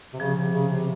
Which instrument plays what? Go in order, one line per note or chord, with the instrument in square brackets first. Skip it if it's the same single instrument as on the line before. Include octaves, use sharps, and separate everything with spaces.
[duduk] C3
[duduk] C#3 [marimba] F3
[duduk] C3
C#3
C3